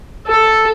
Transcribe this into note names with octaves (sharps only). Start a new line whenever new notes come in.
A4